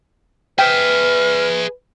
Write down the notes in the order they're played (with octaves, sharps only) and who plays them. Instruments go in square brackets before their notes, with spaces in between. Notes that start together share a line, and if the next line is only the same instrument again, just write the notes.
[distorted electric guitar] G#4 E5 [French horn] B4 [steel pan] G5 [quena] F6